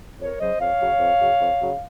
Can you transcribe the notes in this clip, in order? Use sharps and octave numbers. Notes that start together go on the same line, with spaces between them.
F2 A#4 C#5
C#3 F#3 C5 D#5
F2 C#5 F5
C#3 F#3
F2
C#3 F#3
F2
C#3 F#3